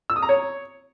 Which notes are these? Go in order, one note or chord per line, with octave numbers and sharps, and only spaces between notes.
E6
D#6
A#5
C#5